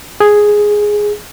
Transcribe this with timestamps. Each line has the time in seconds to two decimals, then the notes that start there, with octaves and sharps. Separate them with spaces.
0.20 G#4